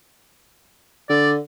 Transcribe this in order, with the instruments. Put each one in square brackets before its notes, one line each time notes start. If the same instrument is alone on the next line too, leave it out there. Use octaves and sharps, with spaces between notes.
[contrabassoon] D3 [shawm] D5